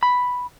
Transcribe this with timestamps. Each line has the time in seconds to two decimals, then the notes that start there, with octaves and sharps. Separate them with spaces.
0.03 B5